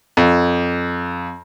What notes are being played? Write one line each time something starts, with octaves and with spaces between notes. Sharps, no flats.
F2